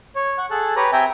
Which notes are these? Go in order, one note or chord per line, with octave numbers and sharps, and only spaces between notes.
C#5
F#5 C#6
G#4 A4 A5 F#6
G4 B4 C#5 A#5
C4 E5 G5 G#5 A#5